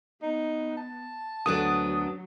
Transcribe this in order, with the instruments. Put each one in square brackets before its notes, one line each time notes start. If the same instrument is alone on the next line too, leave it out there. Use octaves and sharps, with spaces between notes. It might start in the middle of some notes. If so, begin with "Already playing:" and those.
[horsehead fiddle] B3 [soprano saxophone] D#4
[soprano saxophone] A5
[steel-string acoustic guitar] D2 B3 D4 [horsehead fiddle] F#3 [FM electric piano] D#6